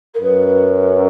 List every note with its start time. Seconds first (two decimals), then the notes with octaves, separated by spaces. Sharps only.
0.14 A#4
0.21 F#2 B4